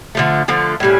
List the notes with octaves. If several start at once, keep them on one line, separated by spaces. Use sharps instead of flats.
D3 F3 A3
D3 F3 A3
A2 G3 C#4